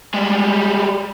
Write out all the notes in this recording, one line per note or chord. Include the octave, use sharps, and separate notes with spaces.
G3 G#3